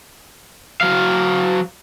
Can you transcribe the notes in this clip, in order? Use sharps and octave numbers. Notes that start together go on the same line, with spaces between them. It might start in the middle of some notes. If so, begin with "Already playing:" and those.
F#3 F5